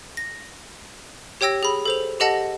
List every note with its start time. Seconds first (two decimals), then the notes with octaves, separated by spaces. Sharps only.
0.17 A#6
1.41 G4 C#5 G5 E6 A#6
1.63 G#4 B5
1.86 A4 C5 F7
2.20 G4 A4 D#5 F#5 A5 A#6